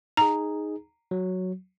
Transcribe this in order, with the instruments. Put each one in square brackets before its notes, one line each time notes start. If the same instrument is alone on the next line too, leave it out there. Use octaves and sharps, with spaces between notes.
[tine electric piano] D#4 G#4 [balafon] A#5
[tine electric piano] F#3